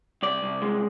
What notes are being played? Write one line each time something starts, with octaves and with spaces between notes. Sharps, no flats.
C2 D5
C2
G#3